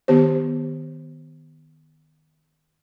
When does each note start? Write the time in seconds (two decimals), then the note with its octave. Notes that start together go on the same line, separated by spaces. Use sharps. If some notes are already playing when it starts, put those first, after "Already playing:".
0.08 D#3 B3 G4 C5